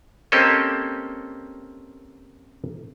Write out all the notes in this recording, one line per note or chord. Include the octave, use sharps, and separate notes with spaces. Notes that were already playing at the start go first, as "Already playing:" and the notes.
A#3 C4 C#4 G4 A4 D#5